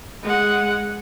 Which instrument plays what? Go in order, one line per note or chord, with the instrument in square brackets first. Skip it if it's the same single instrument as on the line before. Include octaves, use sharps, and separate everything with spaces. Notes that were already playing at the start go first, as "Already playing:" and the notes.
[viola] G#3 F#5